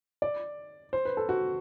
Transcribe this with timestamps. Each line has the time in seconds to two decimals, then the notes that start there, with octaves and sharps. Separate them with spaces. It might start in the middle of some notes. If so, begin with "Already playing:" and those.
0.22 D5
0.93 C5
1.05 B4
1.17 A4
1.29 F#4